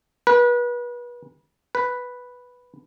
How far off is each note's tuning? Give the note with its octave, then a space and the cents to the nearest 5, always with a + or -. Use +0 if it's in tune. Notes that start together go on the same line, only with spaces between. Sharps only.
B4 -30
B4 +0